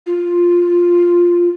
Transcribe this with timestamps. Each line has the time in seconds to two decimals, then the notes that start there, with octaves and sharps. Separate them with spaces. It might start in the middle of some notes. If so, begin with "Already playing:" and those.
0.06 F4